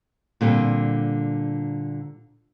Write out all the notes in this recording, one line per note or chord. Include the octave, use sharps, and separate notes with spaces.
A#2 D3 G3 C4